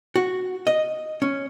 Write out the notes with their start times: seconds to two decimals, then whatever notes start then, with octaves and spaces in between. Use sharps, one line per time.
0.16 F#4
0.67 D#5
1.22 C#4